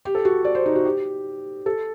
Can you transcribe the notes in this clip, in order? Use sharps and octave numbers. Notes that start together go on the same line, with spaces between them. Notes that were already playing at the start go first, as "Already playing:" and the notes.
G4
A4
F#4
D5
C5
D#4
F#4
G4
A4